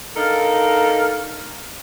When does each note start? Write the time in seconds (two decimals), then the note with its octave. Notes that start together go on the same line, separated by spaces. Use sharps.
0.17 D3 D#4 A4 A#4 F5